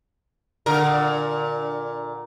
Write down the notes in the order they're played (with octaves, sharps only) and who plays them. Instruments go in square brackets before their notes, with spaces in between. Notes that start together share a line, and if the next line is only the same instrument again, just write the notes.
[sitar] A#2 D3 A#4